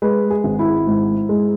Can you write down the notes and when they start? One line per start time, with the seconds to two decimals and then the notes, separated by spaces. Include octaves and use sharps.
0.02 G#3 B4
0.30 G#4
0.44 G#1
0.59 E4
0.87 G#2
1.29 G#3